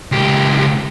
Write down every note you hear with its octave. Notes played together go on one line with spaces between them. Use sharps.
C#2 G4